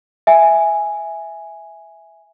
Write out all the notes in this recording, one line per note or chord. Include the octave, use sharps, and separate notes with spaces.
E5 G#5